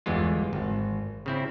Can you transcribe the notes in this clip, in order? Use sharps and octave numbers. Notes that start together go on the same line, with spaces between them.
G1 E2 E3 G#3 F4
G#1
C#3 C4 E4